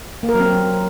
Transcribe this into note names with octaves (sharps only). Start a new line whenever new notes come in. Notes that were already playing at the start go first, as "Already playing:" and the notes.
A#3
A#4
F#3
C4